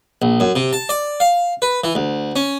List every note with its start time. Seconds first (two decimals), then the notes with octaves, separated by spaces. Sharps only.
0.22 A#1
0.40 F#2
0.55 C3
0.73 A5
0.89 D5
1.20 F5
1.62 B4
1.84 E3
1.95 D2
2.36 C#4